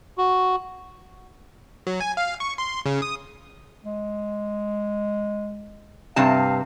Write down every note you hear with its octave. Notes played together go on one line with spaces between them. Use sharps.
F#4
F#3
G#5
F5
C#6
C6
C#3
D#6
G#3
G2 C3 F5 A5